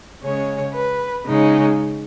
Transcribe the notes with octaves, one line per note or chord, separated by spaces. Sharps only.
C#3 G#3 C#4 C#5
B4
C#3 G#3 C#4 D#4